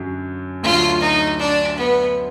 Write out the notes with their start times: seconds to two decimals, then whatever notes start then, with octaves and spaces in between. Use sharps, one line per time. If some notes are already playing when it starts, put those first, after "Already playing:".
Already playing: F#2 D3 F#3
0.63 D2 D3 F#3 F4
1.01 D#4
1.39 D4
1.77 B3